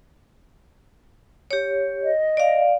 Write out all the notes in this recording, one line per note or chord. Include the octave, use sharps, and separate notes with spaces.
G4 C#5
D#5
D5 F5